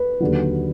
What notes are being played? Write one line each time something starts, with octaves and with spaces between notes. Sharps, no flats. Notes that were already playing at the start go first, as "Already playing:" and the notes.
Already playing: B4
D#2 D3 F#3